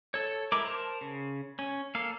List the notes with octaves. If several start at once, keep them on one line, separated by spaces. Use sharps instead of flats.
A4 C#5
G#3 E4 A#4 D6
A#4 C5 A5
C#3
C#4
A#3 A4 F5